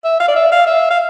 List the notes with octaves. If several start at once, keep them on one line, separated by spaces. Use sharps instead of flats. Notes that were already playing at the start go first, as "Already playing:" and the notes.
E5
F5
D5
E5
F5
E5
F5